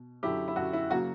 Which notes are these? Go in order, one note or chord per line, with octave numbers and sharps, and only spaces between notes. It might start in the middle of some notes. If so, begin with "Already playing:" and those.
Already playing: B2
F#2 D3 F#3 E4 G4
E4
F#2 D3 F#3 F#4
E4
C#3 F#3 A#3 F#4